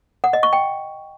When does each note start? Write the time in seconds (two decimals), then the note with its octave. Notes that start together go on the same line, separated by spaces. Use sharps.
0.24 F#5
0.33 D#5
0.43 C#6
0.53 G5